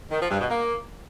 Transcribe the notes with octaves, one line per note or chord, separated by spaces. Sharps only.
D#3
F3
G2
B2
A#3